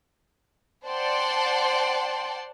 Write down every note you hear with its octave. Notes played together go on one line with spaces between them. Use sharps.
C5 D5 F#5 G5 A5 C6